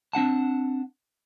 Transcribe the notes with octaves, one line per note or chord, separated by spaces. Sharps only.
C4 D4 F#5 A5